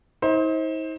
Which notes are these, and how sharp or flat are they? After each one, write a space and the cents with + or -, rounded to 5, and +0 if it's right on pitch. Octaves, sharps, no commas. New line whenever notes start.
D#4 +45 C5 +20